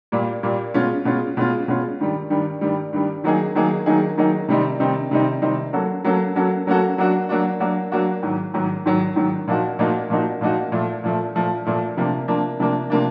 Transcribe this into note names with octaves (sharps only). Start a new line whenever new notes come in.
A#2 G3 A#3
A#2 G3 A#3
B2 G#3 C#4 F4
B2 G#3 C#4 F4
B2 G#3 C#4 F4
B2 G#3 C#4 F4
G2 D#3 G3
G2 D#3 G3
G2 D#3 G3
G2 D#3 G3
D#3 F#3 A#3 D#4 G#4
D#3 F#3 A#3 D#4 G#4
D#3 F#3 A#3 D#4 G#4
D#3 F#3 A#3 D#4 G#4
C3 D#3 G3 C4 D#4
C3 D#3 G3 C4 D#4
C3 D#3 G3 C4 D#4
C3 D#3 G3 C4 D#4
F#3 A#3 C#4 F#4 A4
F#3 A#3 C#4 F#4 A4
F#3 A#3 C#4 F#4 A4
F#3 A#3 C#4 F#4 A4
F#3 A#3 D4 F#4
F#3 A#3 D4 F#4
F#3 A#3 D4 F#4
F#3 A#3 D4 F#4
G#2 D#3 F#3
G#2 D#3 F#3
G#2 D#3 F#3
G#2 D#3 F#3
A#2 F3 A#3 D#4 F#4
A#2 F3 A#3 D#4 F#4
A#2 F3 A#3 D#4 F#4
A#2 F3 A#3 D#4 F#4
A#2 F3 A3
A#2 F3 A3
A#2 F3 A3
A#2 F3 A3
C3 F3 A#3 D4
C3 F3 A#3 D4
C3 F3 A#3 D4
C3 F3 A#3 D4